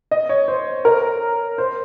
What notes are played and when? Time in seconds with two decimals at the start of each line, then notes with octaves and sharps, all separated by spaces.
0.11 D#5
0.29 C#5
0.48 C5
0.85 A#4
1.58 C5